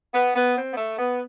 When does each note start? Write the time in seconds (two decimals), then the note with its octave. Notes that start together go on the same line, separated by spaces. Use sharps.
0.15 B3
0.36 B3
0.56 C4
0.72 B3
0.77 A3
0.98 B3